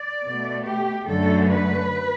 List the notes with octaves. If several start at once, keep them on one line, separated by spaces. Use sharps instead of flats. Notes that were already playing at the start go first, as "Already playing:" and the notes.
Already playing: D5
B2 A3
G4
F#2 D3 F#3 A3 A4
B4